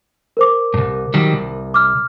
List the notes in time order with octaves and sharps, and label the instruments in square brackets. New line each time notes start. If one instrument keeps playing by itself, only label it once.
[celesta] A#4 C5 D6
[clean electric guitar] C2 G2
D#3 F#3 G3
C2
[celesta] D6 F6